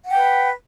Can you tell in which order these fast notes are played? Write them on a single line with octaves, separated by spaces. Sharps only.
F#5 G5 B4